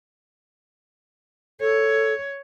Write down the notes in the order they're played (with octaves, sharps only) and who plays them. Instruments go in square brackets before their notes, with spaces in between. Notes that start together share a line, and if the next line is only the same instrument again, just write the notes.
[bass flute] A4 [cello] C#5